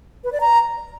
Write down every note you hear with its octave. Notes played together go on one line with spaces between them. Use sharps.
B4
D5
A#5